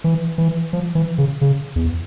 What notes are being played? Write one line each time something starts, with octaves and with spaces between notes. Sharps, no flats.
E3
E3
F3
E3
C#3
C#3
E2